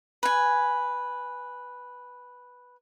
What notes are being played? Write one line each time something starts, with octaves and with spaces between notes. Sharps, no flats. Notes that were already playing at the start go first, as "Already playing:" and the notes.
B4 G#5